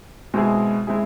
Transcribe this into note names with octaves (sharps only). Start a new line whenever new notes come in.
B2 G#3 C4 E4 G#4
G#3 C4 E4 G#4